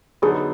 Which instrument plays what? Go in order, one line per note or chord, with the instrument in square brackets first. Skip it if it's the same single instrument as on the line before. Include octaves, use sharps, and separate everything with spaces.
[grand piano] D3 F#3 B3 D#4 [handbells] G#4